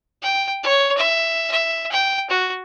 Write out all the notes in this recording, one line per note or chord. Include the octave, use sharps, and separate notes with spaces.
G5
C#5
E5
E5
G5
F#4